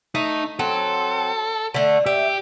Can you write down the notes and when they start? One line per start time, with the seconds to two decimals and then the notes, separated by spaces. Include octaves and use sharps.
0.15 A3 D#4
0.59 F#3 C4 A4
1.74 D3 A3
2.06 G4 E5